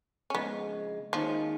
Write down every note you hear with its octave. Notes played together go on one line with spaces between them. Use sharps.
C#4
F2 C#3 G#3 B3
D#2 D#3 F3 G#3 C#4